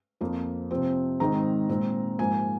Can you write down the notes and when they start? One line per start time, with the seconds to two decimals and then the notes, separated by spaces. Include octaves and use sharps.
0.21 F2 F3 A#3
0.71 C3 F3 C4
1.20 G#2 D#3 G#3 C4 D#4 A#5
1.69 A#2 G#3 C4
2.19 G#2 F3 A#3 G#5